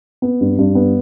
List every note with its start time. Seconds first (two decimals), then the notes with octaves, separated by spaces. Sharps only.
0.22 B3
0.41 G2
0.58 G2
0.75 B3